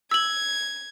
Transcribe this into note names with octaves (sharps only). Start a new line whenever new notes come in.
E6 G#6 F#7